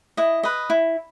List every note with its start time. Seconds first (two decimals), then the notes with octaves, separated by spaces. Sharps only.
0.17 E4 D#5
0.43 B4 D#5
0.70 E4